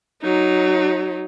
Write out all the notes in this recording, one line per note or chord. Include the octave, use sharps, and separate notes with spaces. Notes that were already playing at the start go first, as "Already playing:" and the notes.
F#3 D#4